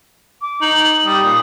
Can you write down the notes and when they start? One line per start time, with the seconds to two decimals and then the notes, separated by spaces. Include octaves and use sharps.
0.42 D6
0.62 D#4 F#7
1.05 G3 D#6
1.24 A#2